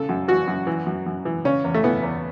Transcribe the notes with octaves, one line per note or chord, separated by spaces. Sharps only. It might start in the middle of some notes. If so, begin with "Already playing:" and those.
Already playing: C#3 A4
F#2
E3 F#4
F#2
E3
F#2
F#2
E3
C#3 C#4
E2
A3
E3 B3
E2